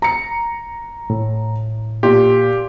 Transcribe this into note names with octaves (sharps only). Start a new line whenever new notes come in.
A#5 C#7
A2
A#2 G4